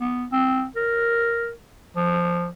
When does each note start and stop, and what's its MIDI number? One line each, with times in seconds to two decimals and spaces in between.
0.01 0.26 59
0.32 0.66 60
0.76 1.52 70
1.96 2.47 53